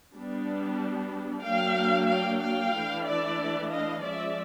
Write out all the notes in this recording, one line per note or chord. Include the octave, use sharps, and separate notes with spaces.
G3 B3 D4
F#3 A#3 D4 F5 G5
F5 G5
F5 G5
E3 A3 D4
D5 E5
D#5 F5
F3 G#3 C#4 D5 E5